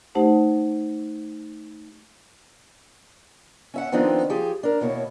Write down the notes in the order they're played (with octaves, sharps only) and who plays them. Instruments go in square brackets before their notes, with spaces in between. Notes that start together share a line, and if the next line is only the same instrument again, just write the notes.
[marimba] A3 D#4 G4 C5 F#5 A5
[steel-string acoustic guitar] C#4 E5 F#5
D#3 F3 B3 C4 D4 D#4
F3 G4 G#4
D4 A#4
D#2 B2 A#3 E4 C#5